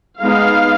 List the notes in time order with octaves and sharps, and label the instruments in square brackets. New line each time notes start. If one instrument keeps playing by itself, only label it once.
[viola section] G#3 B3 D#4 F5